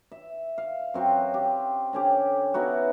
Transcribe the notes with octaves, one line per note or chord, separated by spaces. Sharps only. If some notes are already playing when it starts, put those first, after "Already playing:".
E5
F5
F#2 C4 F#4 F5
G4
D3 C#4 G4
B3 D#4 E4 F#4